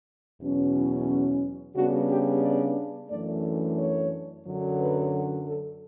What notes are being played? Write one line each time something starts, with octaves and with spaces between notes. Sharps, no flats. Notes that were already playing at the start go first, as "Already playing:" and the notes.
E2 B2 F#3 C#4
E4
F#4
C#3 G3 B3 D4 F#4
G4
D5
F#2 E3 A3 D4 D5
C#5
F#2 D3 F#3
B4
A4